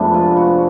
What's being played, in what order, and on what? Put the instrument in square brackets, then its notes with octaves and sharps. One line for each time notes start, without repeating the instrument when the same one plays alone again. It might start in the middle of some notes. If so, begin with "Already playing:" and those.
Already playing: [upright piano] F1 F2 F3 G#3 [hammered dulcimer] A3 B3 D4
[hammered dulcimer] F4
F#4